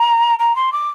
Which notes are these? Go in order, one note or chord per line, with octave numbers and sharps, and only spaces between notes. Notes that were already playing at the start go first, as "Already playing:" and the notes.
Already playing: A#5
A#5
C6
D6